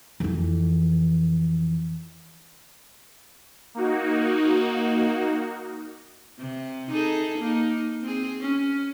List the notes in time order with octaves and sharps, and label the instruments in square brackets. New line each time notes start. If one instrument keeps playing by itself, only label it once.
[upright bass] F2 E3
[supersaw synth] A#3 D#4 F#4
[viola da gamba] C3
D#4 G#4 A4
A#3 D#4
C4 G#4
C#4